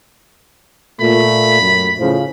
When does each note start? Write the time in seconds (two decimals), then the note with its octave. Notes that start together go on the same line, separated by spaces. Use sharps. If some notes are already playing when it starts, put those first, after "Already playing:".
1.00 A#2 A3 B5
1.62 F#2
2.00 A2 C#3 F3